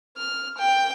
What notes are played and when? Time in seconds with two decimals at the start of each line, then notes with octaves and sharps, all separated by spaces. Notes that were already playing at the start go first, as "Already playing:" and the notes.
0.17 F6
0.57 G5